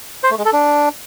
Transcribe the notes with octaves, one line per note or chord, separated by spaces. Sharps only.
C5
A3
G#3
A4
D4